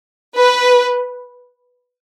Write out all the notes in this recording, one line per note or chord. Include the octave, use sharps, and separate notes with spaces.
B4